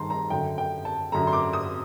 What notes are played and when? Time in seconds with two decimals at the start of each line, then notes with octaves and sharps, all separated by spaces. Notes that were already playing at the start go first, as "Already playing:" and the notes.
Already playing: G2 D#3 A5 A#5 C6
0.10 A#5
0.30 F#2 D3 G5
0.58 G5
0.85 A5
1.12 F#2 D3 A#5
1.27 C6
1.33 D6
1.53 D#6